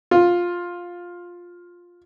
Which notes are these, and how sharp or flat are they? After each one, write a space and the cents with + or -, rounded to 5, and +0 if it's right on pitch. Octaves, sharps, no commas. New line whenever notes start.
F4 +10